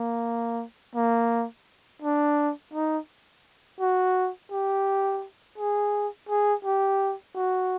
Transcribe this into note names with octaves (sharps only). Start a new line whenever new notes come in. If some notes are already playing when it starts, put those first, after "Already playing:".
Already playing: A#3
A#3
D4
D#4
F#4
G4
G#4
G#4
G4
F#4